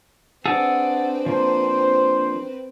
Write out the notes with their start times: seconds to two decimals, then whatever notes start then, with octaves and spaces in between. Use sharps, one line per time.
0.46 C4 D4 G#4 B4 F#5 A5 E6
1.26 F3 A#3 C5